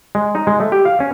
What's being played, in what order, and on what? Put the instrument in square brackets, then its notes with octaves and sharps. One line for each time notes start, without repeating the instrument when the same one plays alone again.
[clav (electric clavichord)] G#3
D#4
G#3
A3
G4
F5
C#4